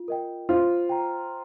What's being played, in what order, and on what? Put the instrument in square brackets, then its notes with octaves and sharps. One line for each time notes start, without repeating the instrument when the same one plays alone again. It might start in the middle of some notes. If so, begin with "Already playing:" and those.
Already playing: [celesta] F4
A#4 D#5 G5
[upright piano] F4 [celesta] C5
[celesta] G5 A#5